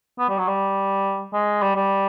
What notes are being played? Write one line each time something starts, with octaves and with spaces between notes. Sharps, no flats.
B3
G3
F#3
G3
G#3
G3
G3